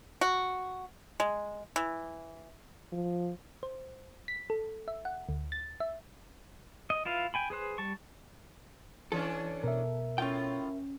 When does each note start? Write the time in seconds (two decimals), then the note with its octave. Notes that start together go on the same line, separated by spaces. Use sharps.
0.21 F#4
1.20 G#3
1.76 E3
2.92 F3
3.63 C5
4.28 B6
4.50 A4
4.88 E5
5.05 F#5
5.29 D2
5.52 A6
5.80 E5
6.90 D#5
7.05 E4 F4 B4 F5
7.34 G5 G#5 B5
7.50 G#4 B4 C5 F#6
7.78 G3 A5 C#6
9.12 E3 C#4 D4 A4
9.63 B2 A#4 E5
10.18 A2 C#4 F4 G5